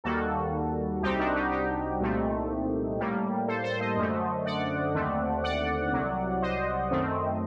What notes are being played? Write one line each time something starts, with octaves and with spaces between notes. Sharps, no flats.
D#2 D#3 G3 A#3 F#4 A4
C2 C3 G3 C4 D#4 G4
D4 F#4
D#4 G4
D#4 G4
C2 A#2 A3 C4
A2 G3 A#3
A4 C5
A4 C5
C5 D#5
F#2 D3 A3
D5 F#5
D#2 D3 A3 C4
D5 F#5
C2 C3 F#3
C5 D#5
F#2 D#3 A3 C4